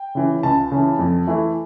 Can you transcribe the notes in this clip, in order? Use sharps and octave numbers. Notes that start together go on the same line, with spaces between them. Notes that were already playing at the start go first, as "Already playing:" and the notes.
Already playing: G5
C#3 E3
C#2 A5
C#3 E3
F2
E3 A3 E4